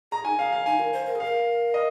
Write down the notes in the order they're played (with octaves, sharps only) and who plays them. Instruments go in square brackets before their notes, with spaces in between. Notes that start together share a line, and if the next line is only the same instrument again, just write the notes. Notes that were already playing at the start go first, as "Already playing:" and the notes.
[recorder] G#4 [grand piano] A#5
[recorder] D#4 [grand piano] G#5
[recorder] G#4 [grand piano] F5
[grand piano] F5
[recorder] D#4 [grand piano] G#5
[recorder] A#4
C5
A#4
G#4
[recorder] A#4 [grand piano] F5
[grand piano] D#5